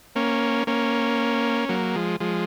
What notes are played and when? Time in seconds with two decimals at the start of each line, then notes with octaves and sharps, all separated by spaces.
0.16 A#3 C#4
0.67 A#3 C#4
1.69 F#3 A#3
1.96 F3 G#3
2.20 F3 G#3